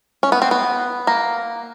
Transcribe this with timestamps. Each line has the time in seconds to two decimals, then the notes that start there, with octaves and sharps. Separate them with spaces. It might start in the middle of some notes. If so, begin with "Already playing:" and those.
0.23 C#4
0.32 B3
0.42 C4
0.51 B3
1.07 A#3